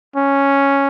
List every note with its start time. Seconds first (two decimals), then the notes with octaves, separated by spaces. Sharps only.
0.16 C#4